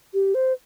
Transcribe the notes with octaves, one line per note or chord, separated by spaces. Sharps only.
G4
C5